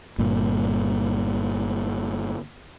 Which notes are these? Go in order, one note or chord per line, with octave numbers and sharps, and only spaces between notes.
G1 G2 A#2